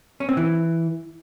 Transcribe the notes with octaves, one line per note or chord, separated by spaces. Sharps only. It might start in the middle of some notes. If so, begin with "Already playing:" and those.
C#4
C4
E3